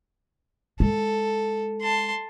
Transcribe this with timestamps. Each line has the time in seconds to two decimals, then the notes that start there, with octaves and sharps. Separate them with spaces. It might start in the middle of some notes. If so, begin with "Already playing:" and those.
0.80 G#3 A4
1.81 A5 C6